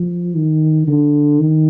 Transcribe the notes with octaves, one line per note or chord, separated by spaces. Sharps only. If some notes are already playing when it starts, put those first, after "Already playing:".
Already playing: F3
D#3
D3
D#3